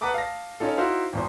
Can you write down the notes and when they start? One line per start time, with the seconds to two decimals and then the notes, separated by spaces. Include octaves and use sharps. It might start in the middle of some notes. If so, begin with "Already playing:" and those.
0.01 B4 F#5 A5 A#5 D6 D#6
0.14 F5 A5 A#6
0.60 C#4 D#4 F4 A4
0.77 D#4 E4 F#4 C5 F5
1.13 G#1 E2 C5